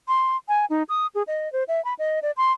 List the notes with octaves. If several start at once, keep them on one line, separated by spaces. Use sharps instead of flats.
C6
G#5
D#4
D#6
G#4
D#5
C5
E5
B5
D#5
D5
C6